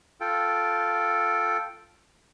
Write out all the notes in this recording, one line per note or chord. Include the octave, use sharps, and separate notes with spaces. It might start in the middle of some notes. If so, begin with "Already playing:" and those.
F4 A4 G5